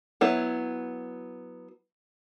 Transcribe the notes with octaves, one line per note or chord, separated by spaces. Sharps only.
F#3 B3 E4 C#5